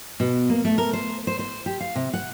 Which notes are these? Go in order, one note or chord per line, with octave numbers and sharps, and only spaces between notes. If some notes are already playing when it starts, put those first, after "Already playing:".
B2
A#3
A3
A#4
C5
C5
C5
G4
F5
C3
F#5